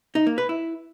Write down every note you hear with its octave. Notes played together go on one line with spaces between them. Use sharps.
D#4
A#3
B4
E4